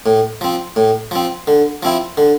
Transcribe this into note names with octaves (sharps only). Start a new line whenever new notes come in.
A2
F3 C4
A2
F3 C4
D3
F3 C4 E4
D3